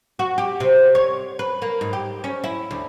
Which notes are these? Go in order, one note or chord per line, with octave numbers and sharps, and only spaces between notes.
F#4
G4
C3
C#5
B4
A#3
G#2
G4
C#4
E4
D2